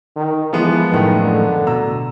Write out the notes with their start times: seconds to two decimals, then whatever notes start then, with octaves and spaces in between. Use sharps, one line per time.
0.16 D#3
0.53 E3 F3 G#3 B3
0.92 F#2 A2 D#3 A3
1.20 D3
1.67 B2 A#5 E6